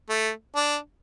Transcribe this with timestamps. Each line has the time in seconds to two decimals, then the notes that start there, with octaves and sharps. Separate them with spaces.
0.10 A3
0.55 D4